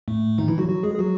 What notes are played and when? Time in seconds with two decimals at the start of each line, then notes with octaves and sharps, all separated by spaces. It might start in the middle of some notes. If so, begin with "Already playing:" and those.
0.08 A2 A3
0.38 D#3 D#4
0.48 E3 E4
0.58 F#3 F#4
0.69 F#3 F#4
0.83 G#3 G#4
0.95 G#4
0.99 F#3 F#4